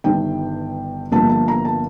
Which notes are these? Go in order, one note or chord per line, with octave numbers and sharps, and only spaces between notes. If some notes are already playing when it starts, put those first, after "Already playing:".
G1 G2 D#3 G5
G1 G2 F3 A#3 A5
A5
A#5
A5